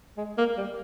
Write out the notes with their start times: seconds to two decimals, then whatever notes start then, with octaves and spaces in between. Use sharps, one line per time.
0.18 G#3
0.38 A#3
0.57 G3